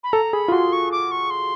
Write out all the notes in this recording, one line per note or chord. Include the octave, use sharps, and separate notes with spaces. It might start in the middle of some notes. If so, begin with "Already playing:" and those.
B5
A4 A#5
G#4 B5
F4
F#4 C6
C#6
D6
C#6
C6